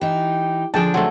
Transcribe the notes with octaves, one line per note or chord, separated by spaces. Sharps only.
E3 D#4 G4
D3 F3 D4 G#4 G5 A5
F#3 A3 C4